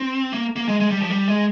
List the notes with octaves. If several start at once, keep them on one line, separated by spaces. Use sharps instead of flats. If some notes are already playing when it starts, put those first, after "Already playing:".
Already playing: C4
A#3
A#3
G#3
G#3
G3
F3
G3
G#3